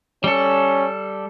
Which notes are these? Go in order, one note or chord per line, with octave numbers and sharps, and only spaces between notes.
G3 C#4 A4